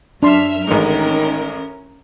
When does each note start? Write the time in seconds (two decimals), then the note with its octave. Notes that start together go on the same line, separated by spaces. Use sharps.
0.23 F#2 D4 E5 C6 F6
0.67 A1 G#2 D#3 C#4 A#4